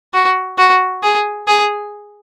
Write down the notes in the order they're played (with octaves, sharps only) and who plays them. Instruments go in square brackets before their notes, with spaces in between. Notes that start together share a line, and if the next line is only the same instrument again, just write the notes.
[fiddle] F#4
F#4
G#4
G#4